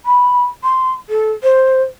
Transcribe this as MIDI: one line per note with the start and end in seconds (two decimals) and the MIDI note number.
0.06 0.42 83
0.64 0.92 84
1.09 1.31 69
1.43 1.83 72